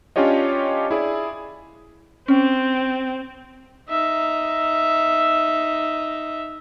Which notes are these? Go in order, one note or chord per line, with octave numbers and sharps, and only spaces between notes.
C#4 D4 F4 G4 C#5 D#5
E4 G#4 D5
C4 C#4
D#4 E5